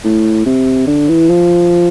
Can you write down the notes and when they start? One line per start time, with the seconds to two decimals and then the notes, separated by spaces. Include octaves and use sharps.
0.04 A2
0.46 C3
0.87 D3
1.09 E3
1.29 F3